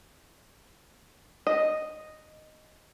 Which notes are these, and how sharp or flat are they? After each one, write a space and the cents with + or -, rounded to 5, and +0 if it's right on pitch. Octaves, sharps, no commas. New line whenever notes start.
D#5 -5